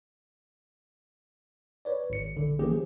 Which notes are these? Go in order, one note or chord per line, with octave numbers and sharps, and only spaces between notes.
B4 C#5 D5
G#1 C#7
A#1 D3
E3 A#3 C#4 G4 G#4
F3